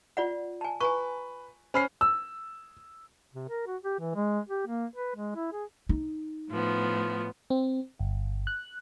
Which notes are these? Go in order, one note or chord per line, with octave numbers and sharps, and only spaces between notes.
F4 D5 F#5
G#5 A5
B4 G#5 A#5 C#6
C#4 C5 B5 F6 C7
E6
C3
A#4
F#4
G4
E3
G#3
G4
A#3
B4
G#3
E4
G#4
D#4
A2 F3 B3
C4
G1
F#6